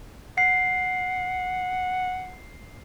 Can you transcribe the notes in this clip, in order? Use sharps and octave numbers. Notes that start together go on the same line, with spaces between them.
F#5 C7